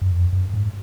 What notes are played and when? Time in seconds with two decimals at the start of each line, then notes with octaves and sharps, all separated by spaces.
0.02 F#2
0.11 F2
0.33 F#2
0.54 G#2